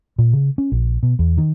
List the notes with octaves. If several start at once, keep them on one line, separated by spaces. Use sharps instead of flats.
A#2
C#3
C#4
A#1
B2
E2
D#3